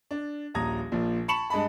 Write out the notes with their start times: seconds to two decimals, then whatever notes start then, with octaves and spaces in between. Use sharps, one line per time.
0.11 D4
0.54 D#1 A#1 A#5 D#6 G#6 A#6
0.92 A#1 A#2 F3
1.28 A5 B5 C#6 C#7 E7 F#7
1.50 G2 G#3 D#5 A5 B5